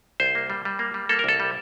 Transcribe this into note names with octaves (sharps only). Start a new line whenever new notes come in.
C2 C5
A#3
G3
G3
A#3
G3
A#3 A4
A#4
C2 A4
G3